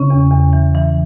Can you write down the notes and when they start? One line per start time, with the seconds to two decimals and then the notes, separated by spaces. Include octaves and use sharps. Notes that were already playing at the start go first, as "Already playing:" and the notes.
Already playing: C#3 C#4
0.10 E2
0.32 E2
0.53 E3
0.75 E3